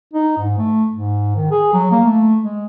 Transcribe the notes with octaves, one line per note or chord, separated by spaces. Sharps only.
D#4
G#2
A3
G#2
D#3
G#4
F#3
A#3
A3
G#3